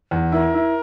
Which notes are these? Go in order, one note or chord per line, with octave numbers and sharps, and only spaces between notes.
E2
E4 A#4
E4